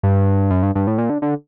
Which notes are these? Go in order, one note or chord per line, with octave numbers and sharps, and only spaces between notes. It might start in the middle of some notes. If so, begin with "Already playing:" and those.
G2
F#2
G2
G2
A2
A#2
D3
D3